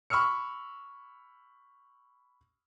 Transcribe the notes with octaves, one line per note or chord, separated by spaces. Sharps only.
B5 C#6 E6 F6 C#7